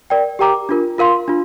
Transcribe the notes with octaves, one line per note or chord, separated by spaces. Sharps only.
A#4 D5 G5
G4 A#4 G5 A#5 D6
D4 F4 A#4
F4 A#4 F5 C6
D4 F4